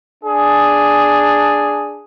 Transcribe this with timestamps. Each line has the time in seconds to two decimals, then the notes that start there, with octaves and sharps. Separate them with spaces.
0.24 D4 G#4